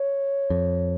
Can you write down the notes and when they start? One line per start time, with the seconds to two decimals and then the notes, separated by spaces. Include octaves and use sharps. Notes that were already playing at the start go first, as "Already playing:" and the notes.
Already playing: C#5
0.50 F2